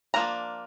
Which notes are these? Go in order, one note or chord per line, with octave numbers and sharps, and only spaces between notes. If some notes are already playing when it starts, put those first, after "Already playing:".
F3 A#3 D4 A#5